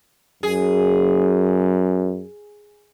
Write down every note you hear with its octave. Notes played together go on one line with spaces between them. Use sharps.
F#2 G#4